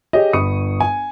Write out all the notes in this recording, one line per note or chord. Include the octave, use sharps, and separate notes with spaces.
G4 G#4 C#5 D#5
G1 B5 C#6 D#6 C#7
G#5